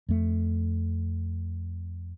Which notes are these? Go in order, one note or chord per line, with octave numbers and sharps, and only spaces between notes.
F2 A3